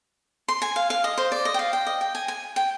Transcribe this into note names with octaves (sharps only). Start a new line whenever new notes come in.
C6
G#5
F5
F5
D#5
C5
D5
D#5
G5
F5
G5
D#5
G5
G#5
G#5
G5